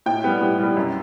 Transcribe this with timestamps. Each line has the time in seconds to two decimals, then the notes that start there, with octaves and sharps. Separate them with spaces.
0.06 A2 G5
0.24 G3 B3
0.41 A2
0.59 G3 B3
0.77 F#2